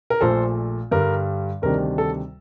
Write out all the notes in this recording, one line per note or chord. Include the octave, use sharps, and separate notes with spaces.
A#4
A#1 A#2 A3 A4 C5
G2 D3 G3 A#4
D2 C3 D#3 G3 D4 A#4
A4